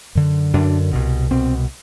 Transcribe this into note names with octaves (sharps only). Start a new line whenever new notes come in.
F#2 D3
F#2 D3 D4
C2 B2
C2 B2 C4